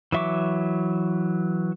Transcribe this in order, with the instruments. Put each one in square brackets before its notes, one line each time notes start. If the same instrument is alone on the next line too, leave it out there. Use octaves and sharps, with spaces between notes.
[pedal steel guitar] E3 F#3 E5 C#6 D6